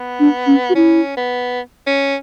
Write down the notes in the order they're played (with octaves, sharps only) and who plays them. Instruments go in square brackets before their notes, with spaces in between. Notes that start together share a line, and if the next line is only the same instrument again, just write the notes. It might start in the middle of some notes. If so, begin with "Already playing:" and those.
Already playing: [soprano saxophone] B3
[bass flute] D4
C#4
F#4
[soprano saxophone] C#4 [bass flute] E4
[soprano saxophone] B3
C#4